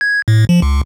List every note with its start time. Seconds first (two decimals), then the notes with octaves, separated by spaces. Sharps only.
0.01 G#6
0.28 A2
0.49 F3
0.62 C#2